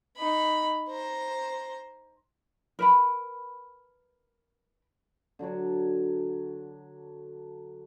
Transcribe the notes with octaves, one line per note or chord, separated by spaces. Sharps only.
D#4 B5
C5 A#5
A#4 B4 B5
D3 F#3 D4 C#5